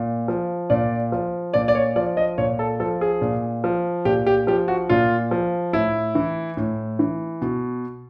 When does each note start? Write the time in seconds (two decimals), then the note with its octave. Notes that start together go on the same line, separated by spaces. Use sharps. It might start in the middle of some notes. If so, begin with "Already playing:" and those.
Already playing: A#2
0.28 F3
0.70 A#2 D5
1.12 F3
1.54 A#2 D5
1.68 D5
1.75 C#5
1.96 F3 D5
2.17 D#5
2.38 A#2 C#5
2.59 A4
2.80 F3 A4
3.01 G#4
3.21 A#2
3.64 F3
4.05 A#2 G4
4.26 G4
4.47 F3 G4
4.68 F#4
4.89 A#2 F4
5.31 F3
5.73 A2 E4
6.15 E3
6.57 A2
6.99 E3
7.42 B2